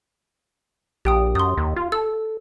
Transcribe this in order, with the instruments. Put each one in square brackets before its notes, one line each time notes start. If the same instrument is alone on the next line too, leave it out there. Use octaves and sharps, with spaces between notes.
[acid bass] A#1 [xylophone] G4 G5 D#6
[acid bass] F#2 [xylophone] C6 D#6
[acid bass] D#2
F4
[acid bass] A4 [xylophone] E6